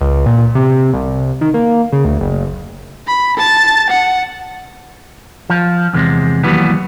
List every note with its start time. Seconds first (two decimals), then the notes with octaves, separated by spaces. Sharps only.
0.01 C#2
0.26 A#2
0.55 C3
0.93 C2
1.41 D#3
1.54 A#3
1.92 C#3
2.05 D2
2.21 F#1
3.07 B5
3.37 A5 A6
3.90 F#5
5.50 F3
5.94 E2 C3 G#3
6.43 D#2 E3 F#3 G3 B3